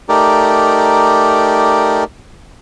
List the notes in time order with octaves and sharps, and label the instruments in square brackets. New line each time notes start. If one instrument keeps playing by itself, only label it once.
[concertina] A3 D#4 G4 A#4 D5